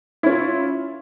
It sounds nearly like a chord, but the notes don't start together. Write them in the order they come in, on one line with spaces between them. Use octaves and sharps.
E4 C#4 F4